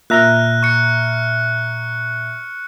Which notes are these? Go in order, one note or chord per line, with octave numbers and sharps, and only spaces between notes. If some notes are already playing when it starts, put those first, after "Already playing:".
A#2 E5 A#5 F6 F#6
C#6 C#7